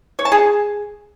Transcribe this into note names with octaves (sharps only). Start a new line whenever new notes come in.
C#5
A5
G#4